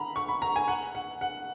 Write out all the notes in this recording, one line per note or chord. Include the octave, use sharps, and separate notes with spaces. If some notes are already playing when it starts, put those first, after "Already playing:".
Already playing: A#5 B5
C#6
B5
A#5
G#5
F#5
F#5
F#5